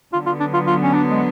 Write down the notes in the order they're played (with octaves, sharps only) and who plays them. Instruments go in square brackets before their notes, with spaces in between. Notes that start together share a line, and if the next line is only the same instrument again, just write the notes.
[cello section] D3 F#3 B3 [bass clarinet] F4
[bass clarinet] F4
D4
F4
F4
C#4
D4
G#3